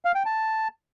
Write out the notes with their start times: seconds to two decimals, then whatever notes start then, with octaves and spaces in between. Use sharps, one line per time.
0.05 F5
0.15 G5
0.25 A5